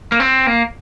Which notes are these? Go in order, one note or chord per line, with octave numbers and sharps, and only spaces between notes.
A#3
C4
A#3